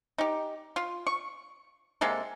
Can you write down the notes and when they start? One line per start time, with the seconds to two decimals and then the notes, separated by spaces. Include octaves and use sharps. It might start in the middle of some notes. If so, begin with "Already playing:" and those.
0.18 D#4 G4
0.76 F4
1.07 C#6
2.01 C3 G#3 A#3 A4